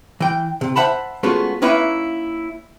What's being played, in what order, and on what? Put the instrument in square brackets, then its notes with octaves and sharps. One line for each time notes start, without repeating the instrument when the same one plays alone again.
[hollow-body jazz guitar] E3 G5
C3
C5 E5 F#5 A5 B5
G#3 A3 B3 C#4 F4 F#4
A#3 C#4 D#4 E4 B4 E5